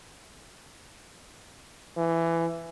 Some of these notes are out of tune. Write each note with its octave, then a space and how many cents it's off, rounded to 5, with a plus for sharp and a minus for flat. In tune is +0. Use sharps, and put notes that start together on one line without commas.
E3 +15